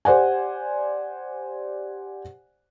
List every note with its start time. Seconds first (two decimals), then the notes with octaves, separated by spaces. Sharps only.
0.05 G4 C5 D5 F#5 G#5